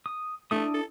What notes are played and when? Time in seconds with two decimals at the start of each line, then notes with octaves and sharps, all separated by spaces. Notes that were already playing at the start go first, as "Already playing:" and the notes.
0.06 D#6
0.51 A3 D4 E4 D#6
0.74 A4